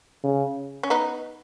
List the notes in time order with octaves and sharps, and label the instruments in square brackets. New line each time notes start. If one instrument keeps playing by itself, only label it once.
[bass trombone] C#3
[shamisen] C#4
B3 D#4